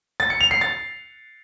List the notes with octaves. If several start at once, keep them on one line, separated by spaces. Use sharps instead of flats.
A6
C#7
F7
C7
A6